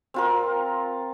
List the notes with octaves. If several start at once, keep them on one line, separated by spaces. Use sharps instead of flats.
C4 F4 A#4